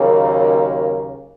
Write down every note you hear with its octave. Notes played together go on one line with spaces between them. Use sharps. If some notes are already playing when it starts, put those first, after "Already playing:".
Already playing: D#2 C#3 F#3 A#3